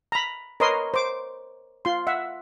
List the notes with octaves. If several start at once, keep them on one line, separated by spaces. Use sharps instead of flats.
A#5 B5
A#4 B4 C#5 D#5 C6 D#6
C5 D6
F4 C6
E5 F#5